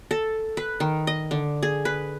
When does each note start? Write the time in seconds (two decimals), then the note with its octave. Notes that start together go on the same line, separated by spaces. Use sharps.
0.11 A4
0.57 B4
0.80 D#3
1.07 D#5
1.31 D3
1.63 G#4
1.85 B4